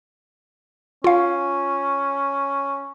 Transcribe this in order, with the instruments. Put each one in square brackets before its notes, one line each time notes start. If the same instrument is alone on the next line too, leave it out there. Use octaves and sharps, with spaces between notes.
[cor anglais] C#4 [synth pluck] F4 F5